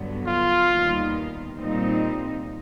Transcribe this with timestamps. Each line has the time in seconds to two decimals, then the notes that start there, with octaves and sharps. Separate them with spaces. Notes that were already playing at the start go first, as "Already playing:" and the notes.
Already playing: G2 D3 F#3 B3
0.27 F4
0.70 D#2 D#3 G3 B3
1.58 A#2 G3 C4 D#4